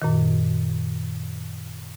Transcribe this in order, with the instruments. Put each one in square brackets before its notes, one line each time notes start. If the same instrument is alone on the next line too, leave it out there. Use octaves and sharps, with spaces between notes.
[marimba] F#2 A#2 D#3